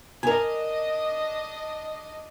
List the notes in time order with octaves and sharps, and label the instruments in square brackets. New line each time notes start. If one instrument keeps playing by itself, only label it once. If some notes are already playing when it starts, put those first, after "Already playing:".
[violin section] D4 D#5 [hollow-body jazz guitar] A#4 G#5